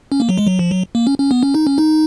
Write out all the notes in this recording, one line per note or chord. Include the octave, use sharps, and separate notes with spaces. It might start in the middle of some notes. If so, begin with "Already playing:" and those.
C#4
A#3
F#3
G#3
F#3
F3
F#3
A#3
C#4
C#4
B3
C#4
D#4
C#4
D#4